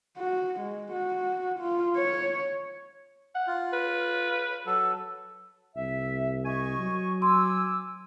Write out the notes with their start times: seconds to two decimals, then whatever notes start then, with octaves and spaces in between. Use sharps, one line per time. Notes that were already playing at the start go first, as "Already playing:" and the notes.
0.18 F#4
0.60 G#3
0.92 F#4
1.59 F4
1.96 C#5
3.35 F#5
3.47 F4
3.73 B4
4.66 F#3 A4
5.76 C2 E5
6.45 D#5 G#5 C#6
6.78 F#3
7.22 G#5 C6 D6 E6